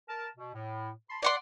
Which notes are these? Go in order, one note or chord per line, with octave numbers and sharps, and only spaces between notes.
A#4 A5
B2
A2
A5 B5 C6
D5 F#5 C6 D6